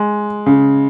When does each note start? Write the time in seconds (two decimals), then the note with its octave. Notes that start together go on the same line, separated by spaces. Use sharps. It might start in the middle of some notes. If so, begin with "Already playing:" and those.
Already playing: G#3
0.46 C#3